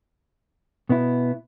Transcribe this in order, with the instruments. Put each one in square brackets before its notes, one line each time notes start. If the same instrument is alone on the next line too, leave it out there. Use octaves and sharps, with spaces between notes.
[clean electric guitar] B2 B3 E4